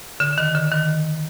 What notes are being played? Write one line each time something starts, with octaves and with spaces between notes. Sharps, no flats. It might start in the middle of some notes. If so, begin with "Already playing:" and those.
D3
D#3
D3
D#3